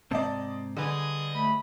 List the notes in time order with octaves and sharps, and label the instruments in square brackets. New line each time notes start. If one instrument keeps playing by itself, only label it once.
[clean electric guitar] G#2 C3 C4 [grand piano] D5 D#5 A5
[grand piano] D3 [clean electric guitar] G3 B4 [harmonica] G#4 D#5
[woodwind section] A3 B5